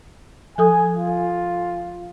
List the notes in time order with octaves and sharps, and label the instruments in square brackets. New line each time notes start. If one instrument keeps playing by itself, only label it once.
[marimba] F3 A4 D#6 [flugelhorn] G#5
[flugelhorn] F4